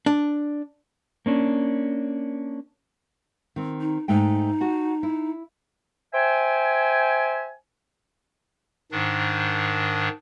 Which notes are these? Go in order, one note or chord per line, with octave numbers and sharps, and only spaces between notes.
D4
A#3 C#4 D4
D#3 C4
D#4
G#2 A3 D#4 G5
F#4 F#5 A5
E4
C5 E5 G5 G#5
G#2 D#3 D4